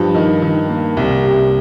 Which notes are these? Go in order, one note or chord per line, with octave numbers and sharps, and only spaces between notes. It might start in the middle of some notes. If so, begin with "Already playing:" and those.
Already playing: G2 F3
D#3
D#3
A#3
C2
C3